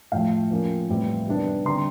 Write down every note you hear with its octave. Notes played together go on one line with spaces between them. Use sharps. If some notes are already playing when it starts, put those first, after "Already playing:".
A2 F3 A3 F5 G5
F3 A#3 C#4
A2 E3 G3 C4
C3 D#3 G3 B3 D4
D3 G3 C4 A#5 C6